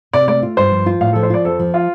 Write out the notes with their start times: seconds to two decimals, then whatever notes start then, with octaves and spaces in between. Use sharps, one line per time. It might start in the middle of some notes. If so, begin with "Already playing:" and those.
0.13 C3 D5
0.28 A3 D5
0.42 F4
0.57 G2 C5
0.72 F3
0.86 F4
1.01 A2 F5
1.13 F3 A4
1.23 C5
1.30 F4 D5
1.45 F2 A4
1.59 F3
1.74 F4